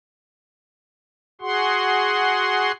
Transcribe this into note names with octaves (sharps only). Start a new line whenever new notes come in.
F#4 G#4 F#5 C6